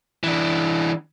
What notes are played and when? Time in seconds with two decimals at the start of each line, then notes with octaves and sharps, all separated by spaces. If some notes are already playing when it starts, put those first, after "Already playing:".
0.23 E3 D4